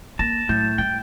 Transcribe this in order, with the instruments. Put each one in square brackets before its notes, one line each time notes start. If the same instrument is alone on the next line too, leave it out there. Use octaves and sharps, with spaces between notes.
[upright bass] A#3 [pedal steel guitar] A5 [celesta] A#6
[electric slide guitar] A2 [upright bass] F#3 [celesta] G6 A6
[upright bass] G3 [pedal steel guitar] G5